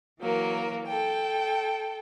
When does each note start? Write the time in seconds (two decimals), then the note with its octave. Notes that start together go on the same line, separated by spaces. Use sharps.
0.21 E3 F#3 A#3 A#4
0.87 A4 G5